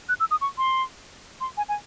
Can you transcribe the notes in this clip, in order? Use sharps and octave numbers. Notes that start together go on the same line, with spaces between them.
F#6
E6
D#6
C#6
C6
C6
G#5
G#5